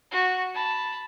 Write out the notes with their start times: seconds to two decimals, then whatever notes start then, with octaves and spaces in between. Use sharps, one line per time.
0.11 F#4
0.54 A5 B5